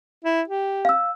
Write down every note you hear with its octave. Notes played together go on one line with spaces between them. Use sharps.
E4
G4
F5 E6